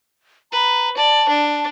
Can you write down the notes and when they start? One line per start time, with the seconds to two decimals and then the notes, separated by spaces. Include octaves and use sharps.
0.52 B4 A#5
0.97 D5 A5
1.29 D4